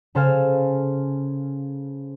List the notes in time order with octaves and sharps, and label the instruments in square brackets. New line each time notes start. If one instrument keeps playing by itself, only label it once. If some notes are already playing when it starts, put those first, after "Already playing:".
[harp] C#3 A4 C5 F5 G#5 F6